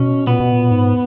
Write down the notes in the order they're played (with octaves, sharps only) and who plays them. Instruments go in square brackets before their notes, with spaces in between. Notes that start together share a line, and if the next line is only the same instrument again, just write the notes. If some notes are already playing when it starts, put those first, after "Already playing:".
Already playing: [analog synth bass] B2 [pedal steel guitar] C#4
[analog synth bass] A#2 [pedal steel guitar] B3
[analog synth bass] B2
A#2
G#2